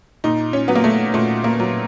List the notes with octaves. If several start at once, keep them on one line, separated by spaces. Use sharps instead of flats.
A#2 D#4
C#4
F#3 B3
A#3
A3
A#2 A3
A#3
F#3